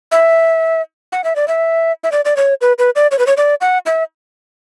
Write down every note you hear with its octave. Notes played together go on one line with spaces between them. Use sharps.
E5
F#5
E5
D5
E5
E5
D5
D5
C#5
B4
B4
D5
C#5
B4
C#5
D5
F#5
E5